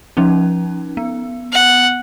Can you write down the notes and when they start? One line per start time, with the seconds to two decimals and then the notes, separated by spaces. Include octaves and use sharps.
0.17 F3 C#4 D#4
0.97 B3
1.53 F#5